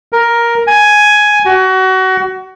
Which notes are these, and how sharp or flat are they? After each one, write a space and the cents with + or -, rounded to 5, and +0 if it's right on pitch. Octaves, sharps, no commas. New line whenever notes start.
A#4 +10
G#5 +5
F#4 +25